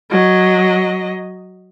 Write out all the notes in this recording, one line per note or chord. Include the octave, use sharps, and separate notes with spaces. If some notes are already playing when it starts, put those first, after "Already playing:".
F#3 D#5